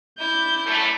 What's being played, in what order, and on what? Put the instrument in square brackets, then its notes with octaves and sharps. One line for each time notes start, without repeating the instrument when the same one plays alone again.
[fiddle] E4 D5 [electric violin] G6
[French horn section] F#2 A3